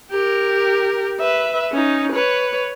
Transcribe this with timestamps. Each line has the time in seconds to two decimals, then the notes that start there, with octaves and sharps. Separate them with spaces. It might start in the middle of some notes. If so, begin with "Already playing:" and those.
0.11 G4 A#4
1.20 B4 E5
1.72 C#4 D#4
2.12 B4 C#5